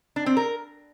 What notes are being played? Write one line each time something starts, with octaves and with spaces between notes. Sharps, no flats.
D4
C4
A#4